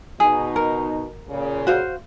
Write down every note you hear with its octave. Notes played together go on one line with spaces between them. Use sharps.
B2 D#4 G#4
A#4
A#2 C#3
F#4 C5 F5